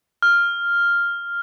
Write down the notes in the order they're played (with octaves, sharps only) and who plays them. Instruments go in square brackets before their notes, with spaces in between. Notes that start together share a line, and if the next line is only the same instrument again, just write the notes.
[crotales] F6